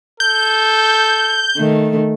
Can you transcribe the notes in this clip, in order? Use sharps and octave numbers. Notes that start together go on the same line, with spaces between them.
A4 G6
D#3 A3